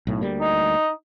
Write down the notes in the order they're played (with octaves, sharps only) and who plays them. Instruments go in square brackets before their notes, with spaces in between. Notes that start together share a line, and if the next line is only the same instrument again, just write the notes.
[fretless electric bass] B1 A2
D2 G3 A#3
[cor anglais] D#4